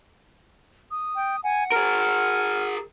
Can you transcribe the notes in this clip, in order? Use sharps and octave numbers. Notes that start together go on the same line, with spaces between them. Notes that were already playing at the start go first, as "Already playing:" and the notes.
D#6
G5
F#5 G#5
G#4 A#4 F6